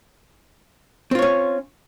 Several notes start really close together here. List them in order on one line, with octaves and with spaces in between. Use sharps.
C4 F4 C#5 C#4